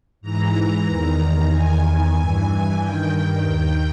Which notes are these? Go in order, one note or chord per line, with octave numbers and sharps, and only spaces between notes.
G#2 E3 A#5
E2 D#3
E2 D#3 G#5
E3
G2
G2 D#3 G5
D#2 D#3